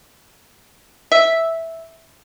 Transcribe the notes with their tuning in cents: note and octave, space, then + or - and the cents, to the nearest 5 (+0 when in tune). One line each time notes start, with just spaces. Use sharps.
E5 -5